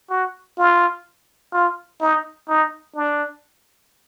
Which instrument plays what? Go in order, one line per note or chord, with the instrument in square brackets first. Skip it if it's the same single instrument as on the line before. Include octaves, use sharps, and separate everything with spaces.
[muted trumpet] F#4
F4
F4
D#4
D#4
D4